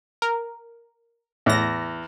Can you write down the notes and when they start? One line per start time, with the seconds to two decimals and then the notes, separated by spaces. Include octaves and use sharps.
0.22 A#4
1.46 E2 A2 A#6